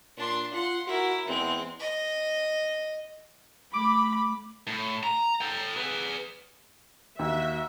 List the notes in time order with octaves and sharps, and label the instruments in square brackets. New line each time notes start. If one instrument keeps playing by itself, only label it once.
[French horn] A#2 [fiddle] D4 C6
[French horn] F4 [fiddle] F#5 C6
[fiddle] E4 A#4 [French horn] F#4
[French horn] E2 [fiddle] G#3 C4
[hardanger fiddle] D#5
[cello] A3 [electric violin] B5 [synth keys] D6
[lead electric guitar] A2
A#5
A4 G5
G#4 B4
[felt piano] D#2 [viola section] F#4 E5